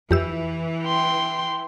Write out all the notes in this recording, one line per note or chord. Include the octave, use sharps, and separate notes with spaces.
F2 E3 G4 E6
G5 C6